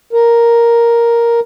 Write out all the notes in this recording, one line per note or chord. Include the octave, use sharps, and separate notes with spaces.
A#4